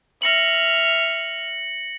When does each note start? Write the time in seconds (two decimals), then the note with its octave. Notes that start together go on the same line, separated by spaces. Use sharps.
0.22 E5 F6 A#6 C#7 F#7